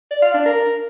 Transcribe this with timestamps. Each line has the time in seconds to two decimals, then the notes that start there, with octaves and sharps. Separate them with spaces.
0.11 D5
0.22 F5
0.34 D4
0.45 A#4